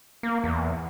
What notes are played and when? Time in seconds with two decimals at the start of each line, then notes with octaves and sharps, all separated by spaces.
0.23 A#3
0.44 E2